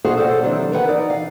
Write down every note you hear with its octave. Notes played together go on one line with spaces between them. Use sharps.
F#4 G#4 A4 C5 F5 F#5
A4 C5 D5 F5 F#5
C3 D#3 E3 F#3 C4 D4
A#4 B4 F#5
E3 D#4 D5
F5